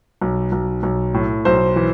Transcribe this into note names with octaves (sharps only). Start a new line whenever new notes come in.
B1
B1
B1
A2
B1 C5
E3